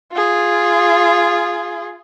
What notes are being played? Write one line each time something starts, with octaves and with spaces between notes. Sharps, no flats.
F4 G#4